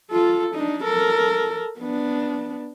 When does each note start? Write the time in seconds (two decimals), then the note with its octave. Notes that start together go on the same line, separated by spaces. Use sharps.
0.11 F4 A4
0.55 D4 D#4
0.84 A4 A#4
1.79 B3 D4